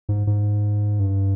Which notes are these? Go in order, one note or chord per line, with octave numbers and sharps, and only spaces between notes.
G#2
G#2
G2